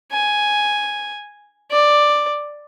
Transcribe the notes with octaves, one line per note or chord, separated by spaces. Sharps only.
G#5
D5